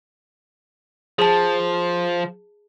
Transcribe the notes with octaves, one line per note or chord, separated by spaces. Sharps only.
F3 G#4 A5